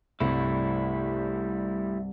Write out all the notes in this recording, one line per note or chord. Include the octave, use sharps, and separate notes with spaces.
C2 G2 C3 G3 A3 E4